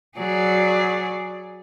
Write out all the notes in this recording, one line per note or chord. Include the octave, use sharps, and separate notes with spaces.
F#3 G#4 D5